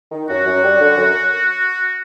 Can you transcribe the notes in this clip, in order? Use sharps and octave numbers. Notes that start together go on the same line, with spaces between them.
D#3
F#2 F#4
F#2
G3
D3
F#2